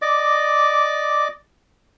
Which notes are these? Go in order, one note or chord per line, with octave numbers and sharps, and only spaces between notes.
D5 D#5 D6